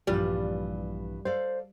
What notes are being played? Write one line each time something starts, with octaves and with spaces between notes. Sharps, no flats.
A#1 G2 E3 G3 F4
A4 C5 D5 F5